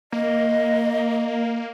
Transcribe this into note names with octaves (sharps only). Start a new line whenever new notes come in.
A#3 D#5